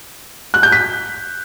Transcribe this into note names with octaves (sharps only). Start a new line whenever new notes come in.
F#6
G6
B6